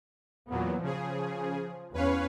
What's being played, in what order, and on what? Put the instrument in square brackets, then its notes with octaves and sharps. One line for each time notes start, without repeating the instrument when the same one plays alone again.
[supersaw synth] E2 A#2 F#3 [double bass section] B3
[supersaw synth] C#3 G#4 [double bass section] F3
[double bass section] E2 C#4 [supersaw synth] B4 C#5 F5